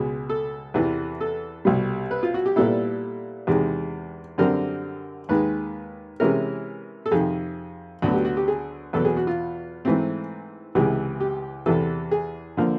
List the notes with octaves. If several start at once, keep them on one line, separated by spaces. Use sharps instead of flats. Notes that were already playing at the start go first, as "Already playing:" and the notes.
Already playing: C#2 B2 G#3
A4
E2 C3 E3
A4
C2 B2 G3
B4
F4
F#4
G4
A#2 G3 B3 E4 A4
E2 C3 D#3 G#3
F#2 D3 G3 C4 A#4
D#2 D#3 G#3 B4
C3 E3 G#3 C#4 E4 A#4
A4
F2 C3 D#3 G#4
D2 D3 F#3 B3 F#4
G4
F#4
G4
G#4
E2 B2 F#3 B3 A4
G#4
F#4
F4
G#2 E3 A3 C4
C#2 C3 E3 G#3
G4
E2 C3 E3 A4
G#4
D3 F3 A#3